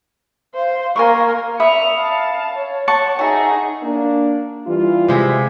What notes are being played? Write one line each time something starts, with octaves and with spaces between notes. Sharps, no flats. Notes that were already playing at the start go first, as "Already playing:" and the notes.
C5 F5
A#3 A#4 G#5 C6 C#6
E5 B5 D#6 C#7 F7
F5 A5
C#5
F#5 A5 C#6
D#4 F#4 G#4 E5
A#3 D4
E3 G3 F4
C3 G#3 E5